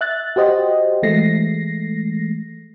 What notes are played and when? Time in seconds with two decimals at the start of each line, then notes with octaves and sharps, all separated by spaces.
0.01 E5 F#6 A6
0.36 F#4 G4 C5 D#5
1.03 E3 G#3 A3 A#6 C7